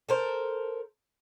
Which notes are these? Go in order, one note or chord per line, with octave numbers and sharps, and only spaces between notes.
A4 A#4 C5